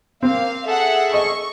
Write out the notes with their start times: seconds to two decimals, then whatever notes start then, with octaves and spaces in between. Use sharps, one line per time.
0.23 A#3 C4 F5
0.66 G#4 A4 E5 F#5
1.14 D#5 C#6